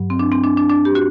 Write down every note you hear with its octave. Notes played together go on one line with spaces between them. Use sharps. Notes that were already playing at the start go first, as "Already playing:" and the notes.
Already playing: G2 F#3
C4
D4
C4
D4
D4
D4
G4
F#4